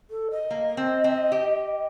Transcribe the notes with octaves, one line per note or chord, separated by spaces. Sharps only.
A4
D#5
A#3
C4
C4
G4